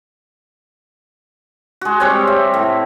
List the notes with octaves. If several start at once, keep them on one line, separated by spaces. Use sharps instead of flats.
G#3 F#4
G3 C4 C#5
E5
A2